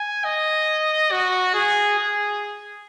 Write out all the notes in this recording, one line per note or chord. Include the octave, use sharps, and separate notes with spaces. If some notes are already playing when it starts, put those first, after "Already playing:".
Already playing: G#5
D#5
F#4
G#4
G#4